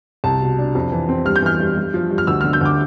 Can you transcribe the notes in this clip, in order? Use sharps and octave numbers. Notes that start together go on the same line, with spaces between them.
C2 A5
B2
D4
F2
E3
C4
G2 F6
G6
E3 F6
G2
G2
F3
G2
F6
D2 E6
D3 F6
G6
D2 D6